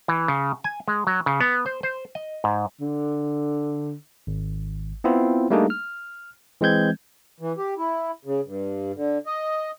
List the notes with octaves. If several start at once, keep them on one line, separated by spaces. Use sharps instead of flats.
E3
C#3
G#5
G#3
F#3
C#3
B3
C5
C5
D#5
G#2
D3
G#1
B3 C4 E4 F4
G3 A3 A#3 D4 D#4 G#4
F6
E3 G#3 C4 G6 G#6
E3
G4
E4
C#3
G2
D3
D#5